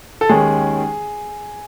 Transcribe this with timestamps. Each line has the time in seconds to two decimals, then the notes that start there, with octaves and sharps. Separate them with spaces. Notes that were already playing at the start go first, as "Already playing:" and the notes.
0.21 A4
0.29 D#2 D#3 G#3 C#4 G#4